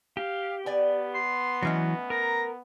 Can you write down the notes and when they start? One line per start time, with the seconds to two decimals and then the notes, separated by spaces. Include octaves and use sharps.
0.17 G4 F5
0.66 B3 D5 G#5
1.14 C6
1.63 E3 F#3 A3 C#4 D#5
2.10 A#4 A#5